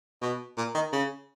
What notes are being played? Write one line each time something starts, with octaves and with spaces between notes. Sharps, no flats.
B2
A#2
D#3
C#3